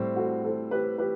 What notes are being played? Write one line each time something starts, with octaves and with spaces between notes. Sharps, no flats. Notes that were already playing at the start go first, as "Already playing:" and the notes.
Already playing: A2 G3 C4
F#4 A4
A4 C5
G4 B4
G4 B4